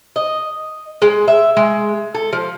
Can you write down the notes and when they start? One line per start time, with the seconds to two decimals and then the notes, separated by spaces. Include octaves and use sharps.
0.16 D#5
1.02 G#3
1.28 E5
1.57 G#3
2.15 A4
2.33 F3